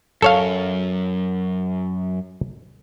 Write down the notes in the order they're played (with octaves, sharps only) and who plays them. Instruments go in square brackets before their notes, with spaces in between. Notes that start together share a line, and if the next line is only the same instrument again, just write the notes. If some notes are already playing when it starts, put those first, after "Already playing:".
[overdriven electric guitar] F#2 [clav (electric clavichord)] A4 C#5 F5